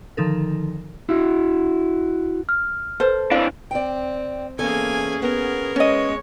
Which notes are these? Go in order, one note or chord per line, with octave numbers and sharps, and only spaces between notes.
D3 D#3 F3 D#4 A4 A#4
E4 F#4
F6
A4 B4 C5
C4 D4 E4 F5
C4 D5 G5
E2 A#3 C#4 G#4 A4 G#5
B3 A#4
G#3 C#4 C#5 D#5